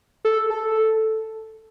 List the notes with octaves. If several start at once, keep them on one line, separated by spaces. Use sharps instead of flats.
A4
A4